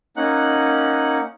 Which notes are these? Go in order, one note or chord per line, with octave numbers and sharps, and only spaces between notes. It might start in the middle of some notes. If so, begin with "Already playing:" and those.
A#3 C#4 D#4 F#5 F#6